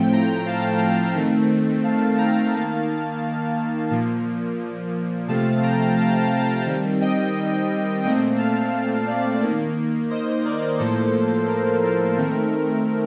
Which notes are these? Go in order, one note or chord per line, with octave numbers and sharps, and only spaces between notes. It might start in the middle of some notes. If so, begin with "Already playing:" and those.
Already playing: A2 F3 A3 C4 G5
G5 A#5
F5 A5
D#3 A3 C4
F5 A5
G5 A#5
D#3 A#3 F5 A5
A#2 F3 A#3
C3 F3 A3 C4 F5 A5
G5 A#5
F5 A5
F5 A5
D#3 G3 C4
D#5 G5
A#2 A3 C4 D#5 G5
F5 A5
F5 A5
D5 F5
D#3 A#3
C5 D#5
A#4 D5
A2 F3 A#3 A4 C5
A#4
A#4
D#3 A3 C4